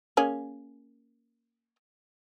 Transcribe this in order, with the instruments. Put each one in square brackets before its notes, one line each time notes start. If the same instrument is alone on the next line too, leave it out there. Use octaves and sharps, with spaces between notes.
[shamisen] A#3 C#4 G#4